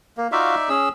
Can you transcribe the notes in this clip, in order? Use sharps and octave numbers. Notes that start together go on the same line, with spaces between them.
A#3
D#4 F4 F#4 D5 E5 F5
C#4 G#4 E6